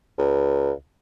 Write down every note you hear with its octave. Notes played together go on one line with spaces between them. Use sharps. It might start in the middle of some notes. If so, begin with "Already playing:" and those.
C#2